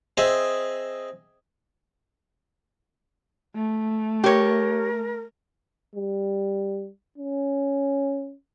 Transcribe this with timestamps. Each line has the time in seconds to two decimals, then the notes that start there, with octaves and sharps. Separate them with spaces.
0.17 C4 G#4 D#5 E5
3.56 A3
4.24 G4 A#4 C#5
5.96 G3
7.18 C#4